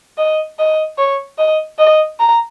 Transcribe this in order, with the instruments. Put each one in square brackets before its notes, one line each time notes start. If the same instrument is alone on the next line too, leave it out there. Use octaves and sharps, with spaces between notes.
[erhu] D#5
D#5
C#5
D#5
D#5
A#5